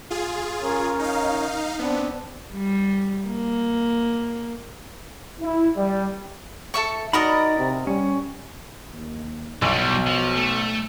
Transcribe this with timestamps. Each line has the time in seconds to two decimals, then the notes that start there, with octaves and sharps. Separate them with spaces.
0.10 F4 G#4
0.62 C#4 A#4 C#5
0.99 D#4 F5
1.79 B3 C4 D4
2.53 G3
3.27 A#3
5.40 E4
5.76 G3
6.74 A4 E5 C#6
7.13 D#4 F#4 A#4 D5 D#5 A#5 B5
7.58 C3
7.87 G3 C#4
8.92 D#2
9.62 B1 B2 E3 G3
10.07 F3
10.36 A3 A4